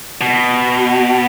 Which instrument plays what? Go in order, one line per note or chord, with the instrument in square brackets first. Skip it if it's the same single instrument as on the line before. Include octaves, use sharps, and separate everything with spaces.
[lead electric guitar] B2